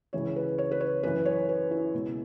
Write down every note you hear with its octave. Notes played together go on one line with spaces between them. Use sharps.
C#2 C#3 E3 C#5
B4
C#5
B4
C#5
F#2 E3 B4
C#5
B4
E4
C#2 B2